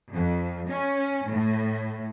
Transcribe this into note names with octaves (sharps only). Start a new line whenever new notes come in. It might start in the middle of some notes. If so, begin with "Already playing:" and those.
F2
C#4
A2